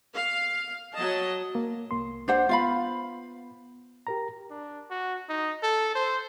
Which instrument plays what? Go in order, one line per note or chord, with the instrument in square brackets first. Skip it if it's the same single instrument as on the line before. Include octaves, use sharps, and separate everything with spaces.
[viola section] F5
F#3 D#5 A5
[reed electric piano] A#3
C2 A#3 C6
[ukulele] D4 C5 F#5
[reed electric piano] B3 [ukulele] F4 F5 B5
[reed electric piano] G4 A#4 A#5
[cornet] D4
F#4
D#4
A4
C5